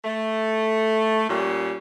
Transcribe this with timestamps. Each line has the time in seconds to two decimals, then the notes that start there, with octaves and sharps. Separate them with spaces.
0.05 A3
1.29 A#2 G3 C#4